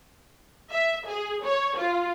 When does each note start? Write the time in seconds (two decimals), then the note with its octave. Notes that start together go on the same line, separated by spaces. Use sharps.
0.71 E5
1.07 G#4
1.44 C#5
1.77 F4